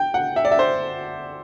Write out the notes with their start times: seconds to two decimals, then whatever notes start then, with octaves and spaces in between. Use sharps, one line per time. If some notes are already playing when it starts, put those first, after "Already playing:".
Already playing: G5
0.14 F#5
0.36 E5
0.45 D5
0.51 E5
0.59 C5